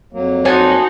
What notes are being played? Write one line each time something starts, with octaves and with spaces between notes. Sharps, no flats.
F2 F#3 A#3
D4 D#4 F#4 C5 G#5